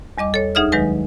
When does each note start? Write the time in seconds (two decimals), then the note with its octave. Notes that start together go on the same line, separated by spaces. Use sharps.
0.18 E2 G3 D#5 D6
0.34 A4 C#5
0.55 D2 D#4 G#4 E5 D#6 F6
0.72 D#3 F#3 G#3 B4 G#5